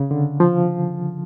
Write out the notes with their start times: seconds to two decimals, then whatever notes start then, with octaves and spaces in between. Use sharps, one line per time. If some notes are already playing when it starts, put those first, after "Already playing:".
Already playing: C#3
0.11 D3
0.40 F3